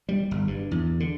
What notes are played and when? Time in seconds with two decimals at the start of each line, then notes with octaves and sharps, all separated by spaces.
0.09 G3
0.31 G1
0.47 G2
0.71 E2
1.00 D3